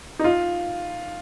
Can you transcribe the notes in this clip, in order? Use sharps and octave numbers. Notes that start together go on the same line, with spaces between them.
D#4
F4